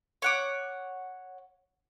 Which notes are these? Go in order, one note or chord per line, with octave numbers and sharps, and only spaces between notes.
C#5 F#5 D6